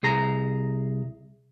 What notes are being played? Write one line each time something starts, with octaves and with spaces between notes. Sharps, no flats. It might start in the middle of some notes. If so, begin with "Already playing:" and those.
C2 G#4 A#5